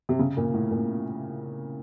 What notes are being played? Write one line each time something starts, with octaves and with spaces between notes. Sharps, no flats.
C3
C#3
A#2
A2
A#2